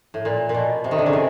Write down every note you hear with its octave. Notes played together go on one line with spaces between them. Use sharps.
A2
A#2
A#2
B2
C3
D#3
D3
C#3
C3